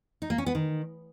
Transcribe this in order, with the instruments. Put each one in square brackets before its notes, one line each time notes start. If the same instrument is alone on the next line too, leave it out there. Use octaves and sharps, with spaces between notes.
[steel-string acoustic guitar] D#4
A#3
C#4
B3
D#3